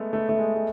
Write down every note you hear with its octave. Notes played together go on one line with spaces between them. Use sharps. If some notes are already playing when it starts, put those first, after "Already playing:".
Already playing: G#3 A3 B3
A3
A3
G#3
G#3